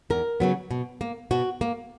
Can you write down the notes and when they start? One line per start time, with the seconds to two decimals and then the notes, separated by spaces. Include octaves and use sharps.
0.10 E2 A#4
0.40 C#3 F#3 B3
0.71 B2
1.01 A#3
1.31 B2 F#4
1.61 A#3